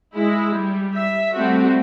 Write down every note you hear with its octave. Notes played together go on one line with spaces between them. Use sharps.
G#3 E4
G3
E5
G3 A3 C4 F#4